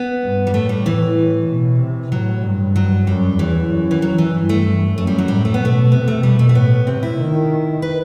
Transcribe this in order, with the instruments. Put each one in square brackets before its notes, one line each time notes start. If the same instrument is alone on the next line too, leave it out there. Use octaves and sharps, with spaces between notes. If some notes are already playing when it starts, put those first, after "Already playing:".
Already playing: [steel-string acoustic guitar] B3
[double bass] G2
[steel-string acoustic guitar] G3
[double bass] A2 [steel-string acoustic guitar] A3
[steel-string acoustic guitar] G3
E3
[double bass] B2
C3
[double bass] A2 [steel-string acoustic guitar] F#3
[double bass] G2
[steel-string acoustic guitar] F#3
[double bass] F#2 [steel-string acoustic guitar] G3
[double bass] E2 [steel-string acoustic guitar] E3
[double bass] F#2
[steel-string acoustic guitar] E3
F#3
E3
[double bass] G2
[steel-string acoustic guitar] A3
[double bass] F#2 [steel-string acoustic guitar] A3
[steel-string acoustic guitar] G3
F#3
[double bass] A2 [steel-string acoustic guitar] G3
[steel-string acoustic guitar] A3
B3
[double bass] B2 [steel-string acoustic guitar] A3
[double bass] C3 [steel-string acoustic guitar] B3
[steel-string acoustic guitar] A3
[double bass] B2 [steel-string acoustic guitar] G3
[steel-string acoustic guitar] A3
A3
[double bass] A2 [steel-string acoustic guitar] B3
[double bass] C3 [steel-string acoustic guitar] C4
[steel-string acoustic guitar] E4
[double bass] D#3
[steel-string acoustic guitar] B4